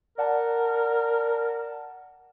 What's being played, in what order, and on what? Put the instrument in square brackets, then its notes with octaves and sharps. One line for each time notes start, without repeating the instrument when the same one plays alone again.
[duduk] A#4 [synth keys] D5 F#5 A5